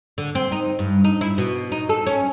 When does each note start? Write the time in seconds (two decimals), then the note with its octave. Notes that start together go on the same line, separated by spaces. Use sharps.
0.18 D3
0.35 C4
0.52 D#4
0.79 G2
1.05 D#4
1.21 E4
1.38 B2
1.72 D#4
1.89 A4
2.07 C#4